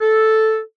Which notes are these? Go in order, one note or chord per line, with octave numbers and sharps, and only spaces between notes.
A4